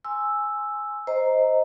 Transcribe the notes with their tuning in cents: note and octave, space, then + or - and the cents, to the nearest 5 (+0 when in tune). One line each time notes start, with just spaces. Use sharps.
G#5 +0 C6 +0 E6 +0
C5 +0 D#5 +10 A#5 +0